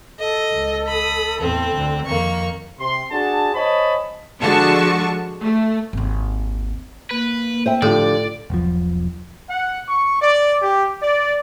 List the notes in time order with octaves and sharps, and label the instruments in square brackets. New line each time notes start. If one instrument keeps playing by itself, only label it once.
[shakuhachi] A4 [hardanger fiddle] D#5
[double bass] C#2
[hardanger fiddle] B5 D#6
[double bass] E2 A2 [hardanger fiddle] C4
[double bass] D2 D3
[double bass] F2 D#3 [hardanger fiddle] A#3 C#6
[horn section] C3 C6
D4 F#4 G#4 A5
C5 C#5 D#5 G#5 A5 B5
[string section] D3 F3 G#3 F#4 A5 C#6
A3
[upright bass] G#1 D#2
[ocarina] A#3 [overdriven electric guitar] B4
[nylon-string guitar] C5 E5 G5
[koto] A2 [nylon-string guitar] D3 F3 G4 [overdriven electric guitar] D5
[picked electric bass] E1 B1 F3
[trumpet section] F#5
C#6
D5
G4
D5